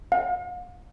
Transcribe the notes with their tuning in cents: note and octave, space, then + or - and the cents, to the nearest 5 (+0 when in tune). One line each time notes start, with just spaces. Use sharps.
F5 +45